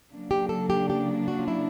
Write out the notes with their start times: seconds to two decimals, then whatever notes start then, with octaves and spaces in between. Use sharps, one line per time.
0.11 C#3 F#3 A#3 D4
0.31 G4
0.49 A4
0.70 G4
0.90 G4
1.28 F#4
1.39 F4
1.48 E4